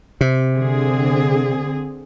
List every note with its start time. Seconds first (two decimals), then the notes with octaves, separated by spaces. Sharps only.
0.21 C3
0.55 D3 C4 G#4